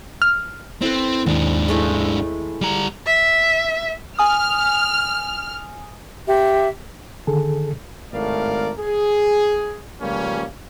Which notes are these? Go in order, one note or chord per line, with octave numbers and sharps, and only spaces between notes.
F6
C4 E4 A4 B4
D#2 G#2 C4 D4
G#3 A3 E4
G3 A#5
E5
G#5 D#6 F6
G4 E5
D3 D#3 G#4 A4
G#1 A2 A3 A#4 D5 F5
G#4
C#2 F3 G3 A#3 C#4